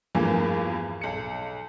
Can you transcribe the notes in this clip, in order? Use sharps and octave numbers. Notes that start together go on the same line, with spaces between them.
E2 G2 E3 F3 A3 A#3
B1 C#7